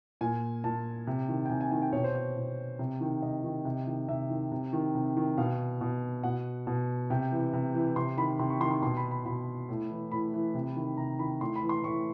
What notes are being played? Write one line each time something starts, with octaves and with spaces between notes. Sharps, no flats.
A#2 G#5
A#2 A5
C3
D#3
G5
C3 G#5
G#5
D#3 G#5
G5
B2 C#5
C5
C#5
B2
C3
D#3
C3 D#5
D#3
C3
D#3
C3 E5
D#3
C3
D#3
C3
D#3
B2 F5
B2
B2 F#5
B2
C3 G5
E3
C3
E3
C3 C6
D#3 B5
C3 C6
C#6
D#3 C6
C6
B2 C6
B5
B5
B2 B5
A2
E3
A2 B5
E3
C3
D#3
C3 A#5
D#3 B5
A2 C6
B5
E3
C6
A2 C#6